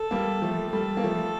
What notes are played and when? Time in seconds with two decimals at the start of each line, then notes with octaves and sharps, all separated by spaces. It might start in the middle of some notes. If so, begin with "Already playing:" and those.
Already playing: A4
0.11 G3 A#3
0.42 F3 A3
0.73 G3 A4
0.97 A#3
1.03 F3 A3